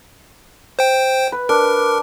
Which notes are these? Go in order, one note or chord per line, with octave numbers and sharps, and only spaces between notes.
C5 G5
B4
D4 A#4